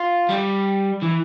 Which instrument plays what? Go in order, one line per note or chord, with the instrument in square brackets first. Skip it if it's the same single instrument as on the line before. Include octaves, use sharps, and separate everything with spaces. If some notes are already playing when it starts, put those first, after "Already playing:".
Already playing: [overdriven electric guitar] F4
G3
E3